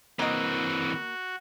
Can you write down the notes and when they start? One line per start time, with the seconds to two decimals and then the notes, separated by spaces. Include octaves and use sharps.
0.19 E3 A#3 C4 F#4 D#5